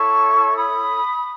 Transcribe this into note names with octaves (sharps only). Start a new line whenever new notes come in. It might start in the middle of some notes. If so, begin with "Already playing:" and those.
Already playing: E4 A4 C#5 A5 C#6
B5 D#6